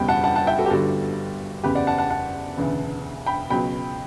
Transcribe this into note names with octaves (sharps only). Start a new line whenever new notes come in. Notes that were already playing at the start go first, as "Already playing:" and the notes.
Already playing: F#1 E2 B2 G3 G5 B5
F#5 A5
F#5 A5
F#5 A5
E5 G5
F#4 A4
G4
G1 G2 D3 G3 F#4 A4
F#1 E2 C#3 G4 B4
D5 F#5
F#5 A5
F#5 A5
F#5 A5
E1 D2 C#3 E3
G5 B5
C#2 B2 F#3 G5 B5